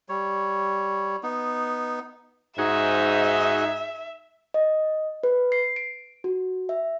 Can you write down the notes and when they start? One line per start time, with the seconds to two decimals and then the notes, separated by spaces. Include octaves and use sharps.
0.09 G3 C#5
1.23 B3 D#4
2.58 G#2 D#4 F#4 G#4 E5
4.54 D#5
5.24 B4
5.52 C7
5.76 D7
6.24 F#4
6.69 E5